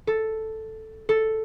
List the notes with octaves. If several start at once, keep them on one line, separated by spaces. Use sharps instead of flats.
A4
A4